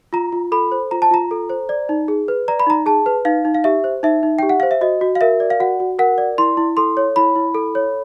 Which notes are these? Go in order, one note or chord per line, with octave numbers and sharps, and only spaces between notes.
F4 A#5
F4
A4 B5
C5
F4 A#5
A5
F4 A#5
A4
C5
D5
D#4
G#4
B4
D5 A#5
B5
D#4 A#5
G#4 A5
B4
D#4 F5
D#4
F5
G4 E5
C5
D#4 E5
D#4
G4 G5
F#5
C5 F5
E5
F#4 D#5
F#4
F5
A#4 E5
D5
F5
F#4 F#5
F#4
A#4 F#5
D5
E4 C6
E4
A4 C6
C#5
E4 B5
E4
A4
C#5